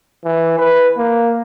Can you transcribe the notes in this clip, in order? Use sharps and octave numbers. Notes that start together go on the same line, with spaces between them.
E3
B4
A#3